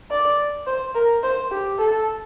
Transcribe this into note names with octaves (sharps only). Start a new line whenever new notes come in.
D5
C5
A#4
C5
G4
A4